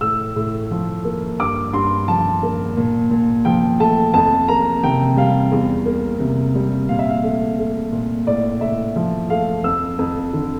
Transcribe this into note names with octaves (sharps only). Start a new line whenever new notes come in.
A2 E6
A2
F3
A#3
G2 D6
G2 C6
F3 A5
A#3
A#2
A#2
F3 G5
A3 A5
F2 A5
A#3 A#5
C3 G5
G3 F5
E2
A#3
C3
G3
A#2 F5
E5
F5
A3
A3
A#2
A2 D5
A2 E5
F3
A3 F5
F2 E6
F2
D3